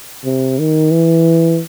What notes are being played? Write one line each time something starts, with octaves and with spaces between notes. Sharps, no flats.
C3
D#3
E3